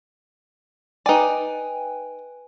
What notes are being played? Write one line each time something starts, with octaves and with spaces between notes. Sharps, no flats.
D#4 B4 D5 G5 G#5